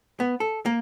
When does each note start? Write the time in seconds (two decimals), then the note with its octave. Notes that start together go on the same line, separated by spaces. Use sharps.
0.20 B3
0.40 A4
0.66 A#3